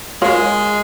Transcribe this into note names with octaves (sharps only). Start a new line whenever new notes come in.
G#3 F4 A#4 C#5